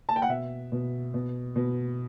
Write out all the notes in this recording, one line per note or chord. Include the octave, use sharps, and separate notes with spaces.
A5
G5
F#5
B2 E5
B2
B2
B2